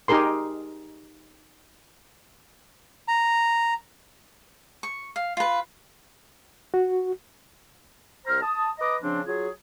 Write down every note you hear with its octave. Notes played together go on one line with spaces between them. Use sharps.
D#4 G4 G#4 A#4 C6
A#5
C#6
F5
F4 B4
F#4
C2 C5 A#5 F6
A5 D#6
B4 D#5 A#5 D6 D#6
C#3 F3 C4 D4
F#3 F4 G#4